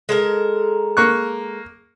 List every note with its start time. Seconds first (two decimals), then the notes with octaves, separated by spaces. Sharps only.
0.09 G#3 A4 A#4
0.97 A#3 C#6 F#6